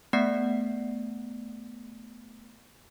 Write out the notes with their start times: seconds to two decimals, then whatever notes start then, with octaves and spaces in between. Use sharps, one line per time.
0.13 A3 B3 D5 F#5 C7